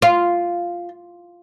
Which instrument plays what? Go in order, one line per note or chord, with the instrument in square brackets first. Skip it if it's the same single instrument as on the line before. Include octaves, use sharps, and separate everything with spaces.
[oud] F4